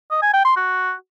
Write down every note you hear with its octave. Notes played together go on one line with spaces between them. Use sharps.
D#5
G#5
G5
C6
F#4